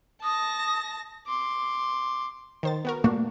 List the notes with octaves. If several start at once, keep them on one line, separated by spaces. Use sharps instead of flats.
A5 D#6 A#6
C6 D6
D#3 C5 A6
B3 F#4 A#4
A#2 A3 A#3 D4 F#4